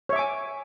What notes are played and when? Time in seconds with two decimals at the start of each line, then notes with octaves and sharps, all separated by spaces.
0.09 C#5
0.13 E5
0.16 D6
0.19 G#5